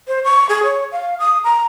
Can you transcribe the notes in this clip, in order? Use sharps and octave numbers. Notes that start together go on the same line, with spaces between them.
C5
C#6
G#4
C#5
F5
D#6
A#5